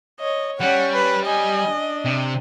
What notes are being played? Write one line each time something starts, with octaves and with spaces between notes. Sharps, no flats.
C#5 D#5
G3 C#4 C#5 F#5
B4
D#5 G#5
D4
C3